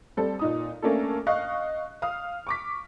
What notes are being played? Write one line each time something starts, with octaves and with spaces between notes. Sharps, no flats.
G3 C4 A4
A#2 D#4 D#6
A3 A#3 C#4 D4 A4
D#5 F5 C#6 F#6
F5 D#6 F6
C#6 D6 B6